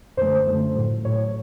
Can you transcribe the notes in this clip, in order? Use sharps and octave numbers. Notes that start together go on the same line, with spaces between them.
F#2 D3 F3 A3 C5
F#2 D3 F3 A3
A2 F#3 A3
A2 F#3 A3 C#5